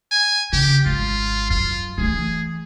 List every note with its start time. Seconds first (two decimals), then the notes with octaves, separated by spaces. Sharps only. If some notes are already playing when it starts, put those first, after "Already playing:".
0.12 G#5
0.53 C#3 G4
0.86 G#1 F4
1.50 F#2 F4
1.98 E3 A3 G#4